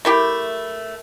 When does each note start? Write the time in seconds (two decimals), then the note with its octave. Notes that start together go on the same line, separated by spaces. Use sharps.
0.05 A3 E4 G4 A#4 B5